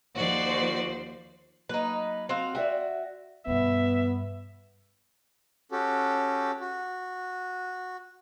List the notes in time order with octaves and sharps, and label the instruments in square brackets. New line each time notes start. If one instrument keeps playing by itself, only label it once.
[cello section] D#2 F3 C5 [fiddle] F#4 D5
[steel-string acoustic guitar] F#3 A#3 [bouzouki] D#4 B4
[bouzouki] C4 F#4 F5
[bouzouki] F#4 [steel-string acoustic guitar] D5 E5 G5
[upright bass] G2 B2 [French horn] B3 [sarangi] E5
[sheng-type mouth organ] C#4 F#4 G4 A4
F#4